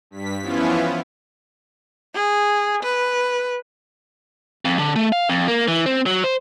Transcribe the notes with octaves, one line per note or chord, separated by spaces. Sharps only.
G2 B6
E3 F3 B3 C#4 E4 F4
G#4
B4
F2
D3
A3
F5
F2
A#3
E3
C4
F#3
C5